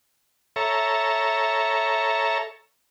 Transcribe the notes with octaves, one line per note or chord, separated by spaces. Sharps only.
A4 C#5 E5 A#5